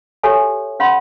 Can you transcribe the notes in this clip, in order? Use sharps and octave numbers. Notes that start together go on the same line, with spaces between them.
F#4 G4 A4 C#5 E5 G#5
C#4 F5 F#5 B5 C6